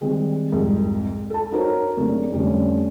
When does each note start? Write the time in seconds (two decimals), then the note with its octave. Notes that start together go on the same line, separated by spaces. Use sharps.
0.01 D#3 G3 G#3 C4
0.52 C2 F2 G#2 C3
1.30 A4 A5
1.51 D#4 F#4 A#4 C5 C#5
1.97 F#1 C3 A3 D4
2.32 F1 D3 G3 C#4